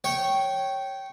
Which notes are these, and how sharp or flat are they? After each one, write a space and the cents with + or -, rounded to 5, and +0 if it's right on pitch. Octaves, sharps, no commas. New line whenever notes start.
C#5 -10 G5 -15